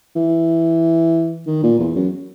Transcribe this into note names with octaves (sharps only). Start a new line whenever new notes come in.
E3
D#3
A#2
E2
F#2